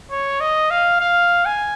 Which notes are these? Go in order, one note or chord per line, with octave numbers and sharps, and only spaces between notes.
C#5
D#5
F5
F5
G#5